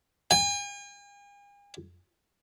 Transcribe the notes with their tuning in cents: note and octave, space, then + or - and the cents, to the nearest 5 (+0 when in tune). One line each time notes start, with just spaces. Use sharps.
G#5 -45